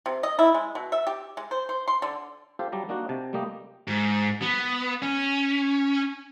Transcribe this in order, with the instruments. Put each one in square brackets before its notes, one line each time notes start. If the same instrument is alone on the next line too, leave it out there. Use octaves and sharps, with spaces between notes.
[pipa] C3
D#5
E4
G#3
B2
E5
G4
G#3
C5
C5
C6
D3
[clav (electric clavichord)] F4 G4 A4 C5 F5
F#3 G3 D5 A5 A#5
A#3 D4 D#4 F#4
C3 A5
G3 A3 A#3 G4 D#5
[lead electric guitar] G#2
B3
C#4